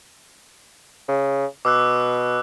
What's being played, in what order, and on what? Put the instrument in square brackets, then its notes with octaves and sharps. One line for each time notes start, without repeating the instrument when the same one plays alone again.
[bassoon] C#3
[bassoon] B2 [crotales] D6 E6 F#6